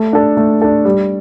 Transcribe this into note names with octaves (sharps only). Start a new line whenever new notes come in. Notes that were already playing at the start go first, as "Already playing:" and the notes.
Already playing: A3
D4 A4
A3
D4 A4
G3